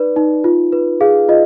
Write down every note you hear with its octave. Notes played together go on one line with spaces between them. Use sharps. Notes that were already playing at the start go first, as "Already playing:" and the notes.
Already playing: D#4 B4 D5
D#4
F4
B4
G#4 F5
F4 D#5